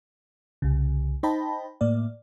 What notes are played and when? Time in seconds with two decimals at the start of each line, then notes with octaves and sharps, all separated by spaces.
0.62 C2 C#3
1.23 D#4 C5 D#5 G5 A5 B5
1.81 A2 A#3 D5